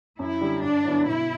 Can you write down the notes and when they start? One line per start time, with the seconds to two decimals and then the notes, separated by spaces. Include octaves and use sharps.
0.19 F#2 E4
0.41 D3 G3
0.62 G2 D4
0.85 D3 F#3 B3 E4
1.06 B2 E4